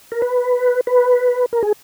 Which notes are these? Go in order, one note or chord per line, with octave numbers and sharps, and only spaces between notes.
A#4
B4
B4
A#4
G#4